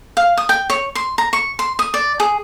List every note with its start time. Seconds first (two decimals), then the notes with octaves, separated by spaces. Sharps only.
0.17 F5
0.37 D#6
0.49 G5
0.70 C#5
0.95 C6
1.18 A#5
1.33 C#6
1.59 C6
1.79 D#6
1.94 D5
2.20 G#4